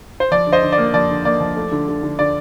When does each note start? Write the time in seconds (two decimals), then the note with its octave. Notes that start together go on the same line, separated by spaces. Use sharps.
0.20 C5
0.31 F3 D5
0.47 D3
0.52 C5 D#5
0.63 D3
0.72 D5
0.78 A#3
0.94 F3 D5
1.10 D3
1.25 A#3 D5
1.40 F3
1.57 A3
1.72 D3
1.88 D3
2.03 D3
2.19 D3 D5